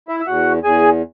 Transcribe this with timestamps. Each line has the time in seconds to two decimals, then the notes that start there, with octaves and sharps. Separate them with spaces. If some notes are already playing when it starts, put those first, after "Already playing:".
0.08 E4 E5
0.20 E5
0.27 E2 F#4 F#5
0.63 E2 G#4 G#5